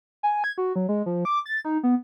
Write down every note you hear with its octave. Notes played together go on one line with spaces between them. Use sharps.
G#5
G#6
F#4
F#3
G#3
F3
D6
A6
D#4
B3